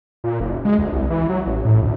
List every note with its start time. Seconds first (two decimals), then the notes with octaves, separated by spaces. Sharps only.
0.24 A#2
0.40 F#1
0.65 G#3
0.78 D2
0.92 C2
1.10 E3
1.29 F#3
1.47 A1
1.65 A2
1.82 D2